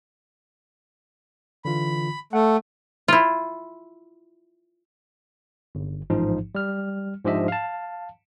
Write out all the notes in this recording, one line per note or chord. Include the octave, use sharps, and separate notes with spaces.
D3 E3 F4 B5
A3 F#5
E4 F4
G1
A1 G#2 F3 D#4
G3 F6
G#2 F3 D4 G4 D#5 E5
F5 A5